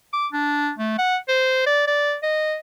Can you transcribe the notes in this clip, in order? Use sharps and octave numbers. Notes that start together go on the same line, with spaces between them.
D6
D4
A3
F#5
C5
D5
D5
D#5